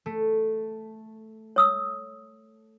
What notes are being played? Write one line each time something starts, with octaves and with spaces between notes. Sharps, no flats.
A3
C#5 D#6 E6